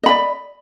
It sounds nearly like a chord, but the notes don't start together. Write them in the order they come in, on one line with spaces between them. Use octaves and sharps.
D#5 B5 D5